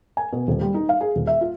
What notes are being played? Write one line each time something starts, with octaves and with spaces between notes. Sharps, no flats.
G#5
B2
D#1
G3
D#4
F5
G#4
D#1
E5
F4